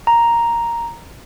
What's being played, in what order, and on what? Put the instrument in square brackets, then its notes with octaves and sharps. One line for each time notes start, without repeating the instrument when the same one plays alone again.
[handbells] A#5